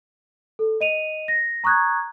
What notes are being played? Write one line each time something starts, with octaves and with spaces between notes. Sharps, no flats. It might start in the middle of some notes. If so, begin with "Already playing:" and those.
A4
D#5 D#7 F7
A#6
A#5 C#6 D#6 F#6 G#6